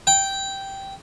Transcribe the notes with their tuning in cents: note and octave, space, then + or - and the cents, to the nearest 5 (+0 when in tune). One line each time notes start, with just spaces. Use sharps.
G5 -5